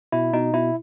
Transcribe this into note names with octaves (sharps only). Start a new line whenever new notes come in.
B2 E4
B2 D#4
B2 E4